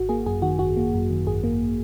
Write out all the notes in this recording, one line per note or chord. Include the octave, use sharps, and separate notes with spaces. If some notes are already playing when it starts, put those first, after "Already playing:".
Already playing: G#1 F#4
A#3 G#4
F#2 G#4
D#3 F#4
G#1 F#4
A#3
F#2
D#3
G#1 G#4
A#3